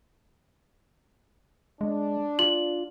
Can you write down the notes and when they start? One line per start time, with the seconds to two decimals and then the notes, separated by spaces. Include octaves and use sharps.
1.81 G#3 D4
2.39 F4 F#7